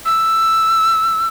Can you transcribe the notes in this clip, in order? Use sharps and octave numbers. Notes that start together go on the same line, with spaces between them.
E6